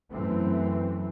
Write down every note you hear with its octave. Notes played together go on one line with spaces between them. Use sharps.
F#2 E3 A3 C4